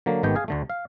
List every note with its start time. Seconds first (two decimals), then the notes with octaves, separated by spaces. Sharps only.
0.06 D3 F#3 A#3
0.23 G#1 D#3 A3 B3 G4 G5
0.35 G#4 F5 G#5
0.48 D2 D3 A3
0.70 F5